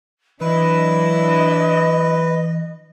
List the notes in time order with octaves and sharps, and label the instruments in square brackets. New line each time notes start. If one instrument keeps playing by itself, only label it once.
[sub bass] E3 [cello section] F#3 D4 E4 [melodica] B4 [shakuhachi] D#5